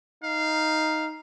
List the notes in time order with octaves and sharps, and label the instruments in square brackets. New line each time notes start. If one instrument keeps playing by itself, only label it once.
[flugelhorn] D#4 [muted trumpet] F5